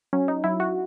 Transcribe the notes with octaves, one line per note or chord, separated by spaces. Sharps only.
F#3 C#4
D#4
F#3 E4
F#4